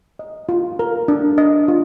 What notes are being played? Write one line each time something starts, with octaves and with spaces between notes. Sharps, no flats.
D#5
F4
A#4
D4
D#5
F4